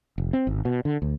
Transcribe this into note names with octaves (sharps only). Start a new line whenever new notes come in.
F1
C4
G#1
B2
D3
D2